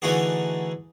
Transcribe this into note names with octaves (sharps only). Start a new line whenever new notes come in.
D3 E3 A3 D#4 F#4 G#4